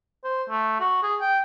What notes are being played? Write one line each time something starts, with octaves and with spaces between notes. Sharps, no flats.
C5
A3
F#4
G#4
G5